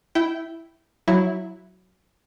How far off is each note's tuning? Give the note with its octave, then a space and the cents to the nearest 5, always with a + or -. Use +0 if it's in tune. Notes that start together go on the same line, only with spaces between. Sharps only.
E4 +0 G5 -15
F#3 +0 E4 +0